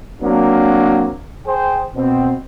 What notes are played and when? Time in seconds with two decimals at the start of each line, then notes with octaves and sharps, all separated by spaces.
0.22 F#3 A#3 C4 D4
1.46 G#4 C5 G5
1.95 B2 C4